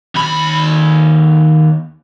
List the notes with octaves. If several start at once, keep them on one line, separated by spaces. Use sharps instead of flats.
D#2 B5